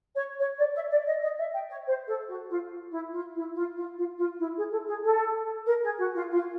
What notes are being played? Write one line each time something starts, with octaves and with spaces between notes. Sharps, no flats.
C#5
C#5
D5
E5
D5
D#5
D#5
E5
G5
C#5
C5
A4
F#4
F4
E4
F4
E4
F4
F4
F4
F4
E4
G#4
A4
G#4
A4
A#4
G#4
F#4
F4
F4